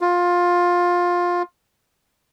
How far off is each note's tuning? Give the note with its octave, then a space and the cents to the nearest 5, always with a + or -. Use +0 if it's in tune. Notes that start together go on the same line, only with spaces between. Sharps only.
F4 +15